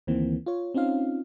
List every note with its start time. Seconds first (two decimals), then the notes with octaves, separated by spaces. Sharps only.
0.07 D2 D#3 E3 A#3 C4
0.46 F4 C#5
0.74 C4 C#4 D#4 F4 F5